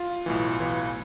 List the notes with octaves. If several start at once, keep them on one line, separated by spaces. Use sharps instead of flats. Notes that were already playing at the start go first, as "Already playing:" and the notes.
Already playing: F4
B1 A2 E3
B1 A2 E3